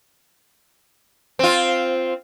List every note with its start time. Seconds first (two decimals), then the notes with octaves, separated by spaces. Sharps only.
1.39 C4 F4